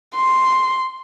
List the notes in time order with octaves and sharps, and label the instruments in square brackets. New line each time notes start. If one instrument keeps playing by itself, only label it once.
[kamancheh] C6